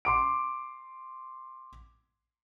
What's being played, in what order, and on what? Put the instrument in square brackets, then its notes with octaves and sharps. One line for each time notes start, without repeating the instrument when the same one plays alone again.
[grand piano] C6 D6 D7